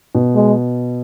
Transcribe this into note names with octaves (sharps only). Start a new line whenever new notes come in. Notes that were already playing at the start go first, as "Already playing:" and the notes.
B2
G#3